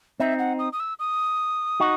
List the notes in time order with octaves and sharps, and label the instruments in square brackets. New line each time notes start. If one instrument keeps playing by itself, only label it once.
[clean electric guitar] C4 D#4 [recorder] E5
[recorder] F#5
D#6
D#6
E6
D#6
[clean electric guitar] D#4 F#4